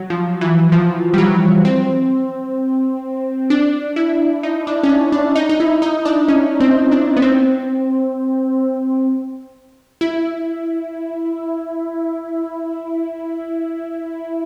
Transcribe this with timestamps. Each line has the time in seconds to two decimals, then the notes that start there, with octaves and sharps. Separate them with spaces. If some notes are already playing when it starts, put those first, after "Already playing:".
Already playing: F#3
0.10 F3
0.41 E3
0.72 F3
1.14 G3
1.18 F#3
1.65 C4
3.50 D4
3.96 E4
4.43 D#4
4.67 D4
4.83 C#4
4.89 D4
5.12 D4
5.35 D#4
5.49 D#4
5.60 E4
5.82 D#4
6.05 D4
6.28 C#4
6.60 C4
6.91 D4
7.16 B3
7.22 C4
10.01 E4